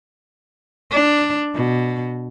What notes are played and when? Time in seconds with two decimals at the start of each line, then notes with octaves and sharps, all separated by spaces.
0.91 D4
1.54 B2